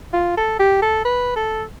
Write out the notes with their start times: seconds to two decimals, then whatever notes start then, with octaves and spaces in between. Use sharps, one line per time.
0.14 F4
0.37 A4
0.59 G4
0.82 A4
1.05 B4
1.36 A4